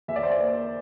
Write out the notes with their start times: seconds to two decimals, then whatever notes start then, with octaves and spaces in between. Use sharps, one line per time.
0.08 E2 E5
0.16 D5
0.23 C5
0.31 D5
0.38 A#3